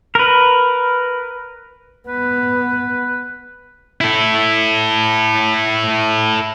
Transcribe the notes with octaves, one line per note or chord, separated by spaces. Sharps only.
A#4 B4
B3 B4
E4 A4